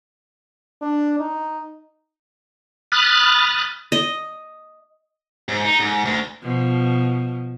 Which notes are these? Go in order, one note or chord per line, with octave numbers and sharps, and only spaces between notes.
D4
D#4
B5 D#6 F6 F#6 A6
D#5
G#2
D#4
G#2
D2
B2 F3